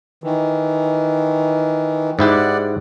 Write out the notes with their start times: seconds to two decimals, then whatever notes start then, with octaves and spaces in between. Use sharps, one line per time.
0.24 D#3 E3
2.19 G#2 E4 G4 D5 F#5